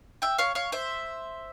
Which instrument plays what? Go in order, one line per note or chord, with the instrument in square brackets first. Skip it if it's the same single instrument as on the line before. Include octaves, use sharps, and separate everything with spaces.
[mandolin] E5 G5
C#5 F5
C#5 F5
C5 E5